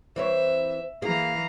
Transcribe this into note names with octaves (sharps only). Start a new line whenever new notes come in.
E3 C4 C#5 E5
E3 A#3 G#4 F5 A#5